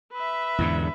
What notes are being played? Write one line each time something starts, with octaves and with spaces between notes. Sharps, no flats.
B4 E5
E2 G#2 D3